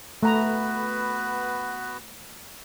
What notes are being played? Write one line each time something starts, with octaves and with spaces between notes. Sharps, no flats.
A3 B3 F#4 B4 A#5